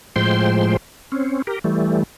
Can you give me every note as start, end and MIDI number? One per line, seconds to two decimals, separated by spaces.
0.16 0.77 45
0.16 0.77 53
0.16 0.77 56
0.16 0.77 72
0.16 0.77 79
0.16 0.77 84
1.12 1.42 60
1.12 1.42 61
1.47 1.59 67
1.47 1.59 70
1.64 2.03 52
1.64 2.03 55
1.64 2.03 57